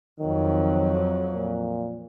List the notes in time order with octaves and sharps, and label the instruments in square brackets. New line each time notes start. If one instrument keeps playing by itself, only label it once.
[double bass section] F2 F#3 [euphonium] D#3
[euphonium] A#2